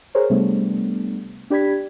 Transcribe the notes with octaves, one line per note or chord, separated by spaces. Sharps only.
G#4 A#4 C5 C#5
C3 G3 A3 B3 D4
D4 G4 D5 B5 G#6 B6